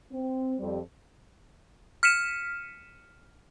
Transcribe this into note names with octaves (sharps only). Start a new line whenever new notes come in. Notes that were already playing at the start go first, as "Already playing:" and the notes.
C4
F2 G3 C4
F6 B6 C#7 D#7 E7